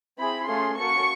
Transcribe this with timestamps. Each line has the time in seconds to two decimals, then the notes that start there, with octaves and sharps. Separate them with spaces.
0.18 C4 E4 G#4 B5
0.47 A3 C#4 F4 G#4 C6
0.76 A#3 C#4 F#4 A4 C#6